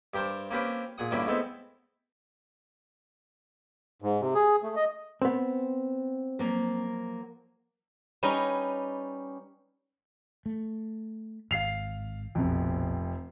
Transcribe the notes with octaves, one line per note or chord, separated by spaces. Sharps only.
G2 G4 A#4 C5 A5
A#3 C4 C#4 G4 A#4 B4
A#2 G#4 F#5 D#6
G2 D3 A#3 C#4 D4 E4
G#3 A3 B3 C4 E4 A4
G#2
C3
G#4
A3
D#5
B3 C4
F3 F#3 A#3
G3 C#4 D#4 B4 D#5
A3
G#1 F5 C7 F7
F1 A#1 F2 B2